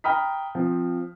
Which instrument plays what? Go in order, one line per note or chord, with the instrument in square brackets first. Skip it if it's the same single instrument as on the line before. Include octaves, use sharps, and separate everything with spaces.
[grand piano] G5 A#5 B5 D#6 F6 B6
F3 C4